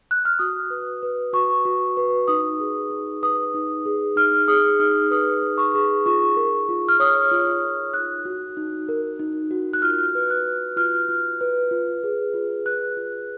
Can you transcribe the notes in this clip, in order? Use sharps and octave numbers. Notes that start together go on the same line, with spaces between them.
F#6
F6
F#4 D#6
B4
B4
F#4 C#6
F#4
B4
D#4 D#6
G#4
D#4
B4 D#6
D#4
G#4
D#4 F6
G#4 D#6
D#4 F6
B4 D#6
D#4
C#6
G#4
F4 C#6
A#4
F4
F6
C#5 D#6
F4
A#4
D#4 F#6
F#4
D#4
A#4
D#4
F#4
F#6
F4 F6
B4
F#6
B4
F4 F6
F4
B4
F4
G#4
F4
B4 F#6
F4